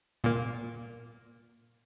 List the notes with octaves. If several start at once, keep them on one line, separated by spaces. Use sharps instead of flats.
A#2 A#3